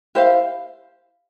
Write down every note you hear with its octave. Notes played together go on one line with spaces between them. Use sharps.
E4 G4 C5 F5